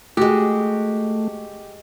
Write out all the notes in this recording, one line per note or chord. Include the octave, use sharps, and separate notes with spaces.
G#3 A3 F#4 G4